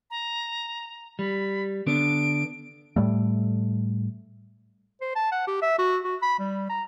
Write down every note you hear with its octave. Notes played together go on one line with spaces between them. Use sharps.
A#5
G3 B5
D3 B3 D4 D7
A2 G3 A3
C5
A5
F#5
G4
E5
F#4
F#4
B5
G3
A#5